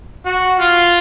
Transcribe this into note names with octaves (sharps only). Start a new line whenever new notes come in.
F#4
F4